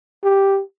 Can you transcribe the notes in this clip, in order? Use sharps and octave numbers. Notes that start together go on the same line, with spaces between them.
G4